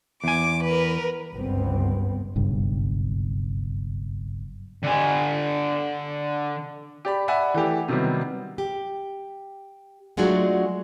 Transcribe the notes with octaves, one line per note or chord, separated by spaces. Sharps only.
E2 G#5 D6
A#4 B4
G1 C#2 F#2 B3 C4
F#1 B1 G2
D3 G#5
G4 D5 B5
D5 E5 F#5 G#5 B5
E3 A3 G4
C3 D#3 F#3 G3 B3 C4
G4
F#3 G#3 A3 D4 F4 F#4